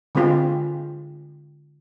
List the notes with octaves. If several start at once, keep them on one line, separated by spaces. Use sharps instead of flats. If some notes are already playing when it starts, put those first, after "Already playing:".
D3 G#3 C4 F4 G4